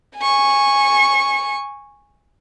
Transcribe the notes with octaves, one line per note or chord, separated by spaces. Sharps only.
G#5 C#6